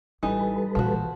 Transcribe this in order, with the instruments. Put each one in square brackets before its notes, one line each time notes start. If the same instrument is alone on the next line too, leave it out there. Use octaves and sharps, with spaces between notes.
[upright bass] A1 [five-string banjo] E3 D#4 [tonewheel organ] G3 A4 B4
[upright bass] A#2 E3 [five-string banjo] F3 F#4